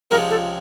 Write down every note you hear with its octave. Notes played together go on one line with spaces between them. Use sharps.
C#2 C3 F3 G#3 C4 A#4
A4